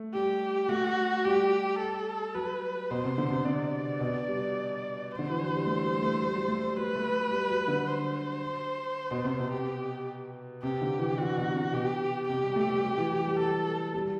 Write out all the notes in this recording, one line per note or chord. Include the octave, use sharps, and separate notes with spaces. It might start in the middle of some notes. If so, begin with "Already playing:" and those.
Already playing: A3
G3 G4
A3 F#4
G3 G4
A4
F#3 B4
B2 C5
C3
D3
C3
C3 D5
B2
G3
C5
D3
E3
F#3
G3
A3
G3
A3
G3
F#3
A3
G3
F#3 B4
A3
G3
F#3
D3
C5
B2
C3
B2
G4
C3 G4
D3
E3
D3 F#4
B2
C3
B2 G4
C3 G4
G3
A3
G3
F#3
E3
F#3
G3
G3 A4
G3